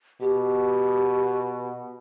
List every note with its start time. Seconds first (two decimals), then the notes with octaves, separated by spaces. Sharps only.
0.21 B2 G4